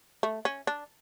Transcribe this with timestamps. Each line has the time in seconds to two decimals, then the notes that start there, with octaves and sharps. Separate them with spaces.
0.23 A3
0.45 C#4
0.67 D4